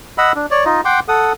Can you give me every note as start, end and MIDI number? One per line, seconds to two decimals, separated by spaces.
0.18 0.32 75
0.18 0.32 78
0.18 0.32 83
0.18 0.32 88
0.35 0.46 62
0.51 0.65 73
0.51 0.65 74
0.65 0.81 63
0.65 0.81 65
0.65 0.81 75
0.85 1.00 78
0.85 1.00 79
0.85 1.00 84
0.85 1.00 86
1.08 1.33 69
1.08 1.33 78
1.08 1.33 87